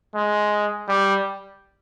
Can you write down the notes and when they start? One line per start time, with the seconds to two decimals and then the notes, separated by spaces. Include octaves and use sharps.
0.15 G#3
0.89 G3